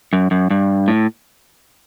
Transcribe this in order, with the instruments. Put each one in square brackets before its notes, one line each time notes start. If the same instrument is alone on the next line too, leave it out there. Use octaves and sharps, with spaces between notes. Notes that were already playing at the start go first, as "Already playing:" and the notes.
[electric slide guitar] F#2
F#2
G2
A2